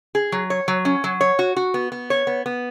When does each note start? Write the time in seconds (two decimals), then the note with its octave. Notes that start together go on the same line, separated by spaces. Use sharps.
0.15 G#4
0.32 F#3
0.50 C#5
0.68 F#3
0.85 C#4
1.04 F#3
1.21 C#5
1.39 F#4
1.56 F#4
1.74 B3
1.92 B3
2.10 C#5
2.27 B3
2.46 B3